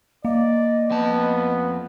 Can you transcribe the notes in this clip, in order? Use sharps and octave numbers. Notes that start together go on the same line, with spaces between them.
A#3 D5 D#5
F2 B3 A5